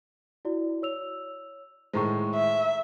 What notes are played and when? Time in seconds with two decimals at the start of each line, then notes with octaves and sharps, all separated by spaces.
0.45 E4 F#4 D5
0.82 C#5 E6 F7
1.93 A2 D#3 G#3 C5 A#5 C#6
2.35 E5